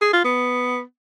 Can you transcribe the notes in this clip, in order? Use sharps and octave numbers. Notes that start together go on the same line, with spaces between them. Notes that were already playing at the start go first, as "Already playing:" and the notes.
G#4
F4
B3